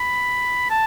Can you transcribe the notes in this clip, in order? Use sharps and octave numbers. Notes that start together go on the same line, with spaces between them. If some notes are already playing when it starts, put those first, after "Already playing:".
Already playing: B5
A5